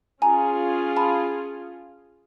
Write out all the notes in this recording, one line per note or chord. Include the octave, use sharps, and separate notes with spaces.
C#4 F4 G#4 G#5 A#5
A5 B5